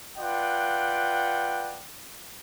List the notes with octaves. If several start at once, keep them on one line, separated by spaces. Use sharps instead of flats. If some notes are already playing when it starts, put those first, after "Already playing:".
F4 B4 D5 F#5 G5